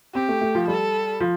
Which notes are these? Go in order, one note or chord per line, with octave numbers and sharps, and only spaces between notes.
C4 G4
A3
A3
F3
G3 A4
F3